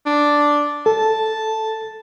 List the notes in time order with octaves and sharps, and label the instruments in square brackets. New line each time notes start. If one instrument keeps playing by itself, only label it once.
[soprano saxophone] D4
[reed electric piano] A4 [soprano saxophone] A5